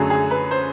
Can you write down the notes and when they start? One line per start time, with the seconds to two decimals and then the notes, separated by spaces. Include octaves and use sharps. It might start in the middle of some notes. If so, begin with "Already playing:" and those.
Already playing: F#2 D3 F#3 A3 G#4
0.10 G#4
0.31 B4
0.51 C5